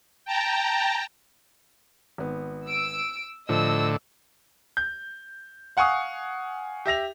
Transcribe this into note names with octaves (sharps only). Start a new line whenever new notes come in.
G5 A5 A#5
G#1 B3
E6 D7
A2 D3 F3 D#5 A5 E6
G6
F5 F#5 G#5 C#6 D#6
G4 E5 A#6 F7